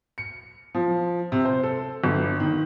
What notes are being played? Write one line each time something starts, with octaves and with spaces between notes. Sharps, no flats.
C#7
F3
C3
C5
A4
G1
D#3